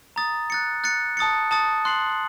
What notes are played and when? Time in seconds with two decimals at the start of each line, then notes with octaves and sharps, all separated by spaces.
0.16 A#5 D#6 A6
0.50 F#6 A6 C#7
0.84 F#6 A6 C#7
1.17 A5 D#6 A6 C#7
1.51 A5 D#6 A6 C#7
1.85 C6 F#6 C7 F#7